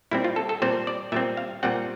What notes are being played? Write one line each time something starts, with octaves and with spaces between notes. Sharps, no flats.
A#2 G3 C4 E4
F4
A4
A4
A#2 G3 C4 C5
D5
A#2 G3 C4 E5
F5
A#2 G3 C4 F#5